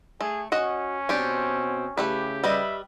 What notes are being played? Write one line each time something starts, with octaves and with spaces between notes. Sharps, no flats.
A3 G#4
C#4 F#4 D#5 F#5
B2 C4 D4 G4 G#5
C#3 A3 E4 G4 B4
G3 B4 D#5 E5